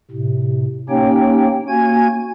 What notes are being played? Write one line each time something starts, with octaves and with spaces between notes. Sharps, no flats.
A2 C3
A#3 C#4 D#4 G4 C#5 G5
A#3 F#4 G#5 G#6